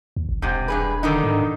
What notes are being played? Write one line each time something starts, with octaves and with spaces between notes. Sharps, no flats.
D#2
G#1
E1 G#2 C3
G2 G#4 B4
D3 D#3 D#4
G#2